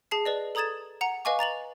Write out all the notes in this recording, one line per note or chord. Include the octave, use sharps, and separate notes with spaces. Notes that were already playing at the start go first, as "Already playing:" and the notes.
G#4 A5 C7
B4 D5 D#5
A4 A#5 D#6 G#6 A6 E7
F#5 A#5 C#7
B4 D#5 F5 G#5 C#6 D6
A#5 A6 F7 F#7